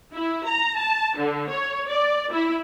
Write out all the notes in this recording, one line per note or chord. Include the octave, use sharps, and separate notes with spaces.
E4
A#5
A5
D3
C#5
D5
E4